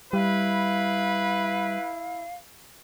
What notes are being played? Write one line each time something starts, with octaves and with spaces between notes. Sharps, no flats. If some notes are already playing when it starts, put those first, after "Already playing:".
G3 E4 B4 F5